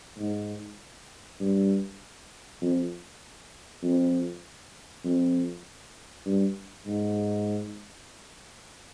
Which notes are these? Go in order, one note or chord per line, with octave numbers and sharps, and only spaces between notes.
G#2
G2
F2
F2
F2
G2
G#2